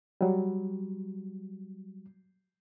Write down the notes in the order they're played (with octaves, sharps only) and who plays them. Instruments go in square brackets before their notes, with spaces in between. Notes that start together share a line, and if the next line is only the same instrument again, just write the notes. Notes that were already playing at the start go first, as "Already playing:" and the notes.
[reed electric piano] F#3 G3